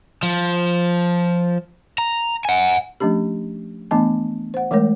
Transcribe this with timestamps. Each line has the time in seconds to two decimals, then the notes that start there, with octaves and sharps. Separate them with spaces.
0.23 F3
1.98 A#5
2.45 F#5 G#5
3.00 F3 A3 C#4 D4 G4
3.91 E3 A3 B3 D4 D#5 A5
4.54 C5 F#5
4.71 E3 G#3 A3 A#4 C#5